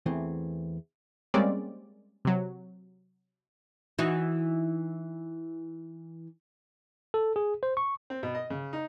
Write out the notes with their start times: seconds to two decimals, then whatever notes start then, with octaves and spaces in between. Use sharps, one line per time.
0.06 E2 E3 A3 C4
1.34 G3 G#3 A#3 C4 C#4 D5
2.25 C3 F#3
3.99 E3 D#4 F#4
7.14 A4
7.36 G#4
7.63 C5
7.77 C#6
8.10 C4
8.23 B2
8.35 D#5
8.50 C#3
8.73 D#4